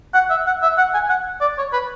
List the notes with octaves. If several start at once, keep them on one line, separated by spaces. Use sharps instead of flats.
F#5
E5
F#5
E5
F#5
G#5
F#5
D5
C#5
B4